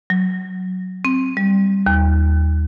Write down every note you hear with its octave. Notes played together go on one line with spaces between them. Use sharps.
F#3
C4
G3
D#2